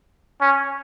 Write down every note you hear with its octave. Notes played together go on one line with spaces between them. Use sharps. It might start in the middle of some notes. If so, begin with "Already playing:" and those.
C#4